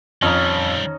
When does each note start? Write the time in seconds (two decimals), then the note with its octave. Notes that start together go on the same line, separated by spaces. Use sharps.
0.22 F2 D#3 G3 C#4 D#4